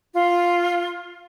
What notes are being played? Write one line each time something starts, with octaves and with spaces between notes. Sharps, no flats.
F4